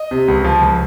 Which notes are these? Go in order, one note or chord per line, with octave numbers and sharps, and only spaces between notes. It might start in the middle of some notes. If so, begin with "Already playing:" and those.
Already playing: D#5
C3
C#2
F3
C#2